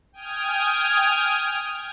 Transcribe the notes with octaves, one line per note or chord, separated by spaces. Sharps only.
G5 G#5 D#6 F6 G#6